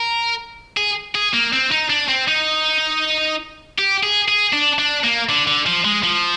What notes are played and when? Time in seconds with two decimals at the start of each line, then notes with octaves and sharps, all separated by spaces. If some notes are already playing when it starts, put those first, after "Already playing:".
Already playing: A#4
0.77 G#4
1.15 G#4
1.33 A#3
1.53 C4
1.72 D#4
1.90 D4
2.09 C4
2.28 D#4
3.78 G4
4.03 G#4
4.28 G#4
4.53 D4
4.79 D4
5.04 A#3
5.29 D3
5.47 D3
5.66 F3
5.85 G#3
6.04 F3